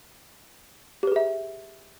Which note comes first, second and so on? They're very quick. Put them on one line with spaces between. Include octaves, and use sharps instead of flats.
G4 B4 G#4 E5